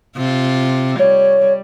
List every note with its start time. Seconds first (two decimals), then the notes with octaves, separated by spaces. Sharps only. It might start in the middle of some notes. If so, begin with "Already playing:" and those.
0.16 C3 F4
0.99 G3 C#5